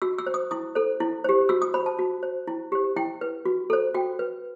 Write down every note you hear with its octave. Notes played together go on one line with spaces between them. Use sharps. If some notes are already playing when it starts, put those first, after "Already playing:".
F#4 E6
E6
C5
D#6
E4 D#6
A4 C5
E4
G4 C5
F#4 E6
D#6
C5 B5
A5
F#4
C5
E4
G4 C5
E4 G5
B4
F#4
A4 C5
F#4 G5
B4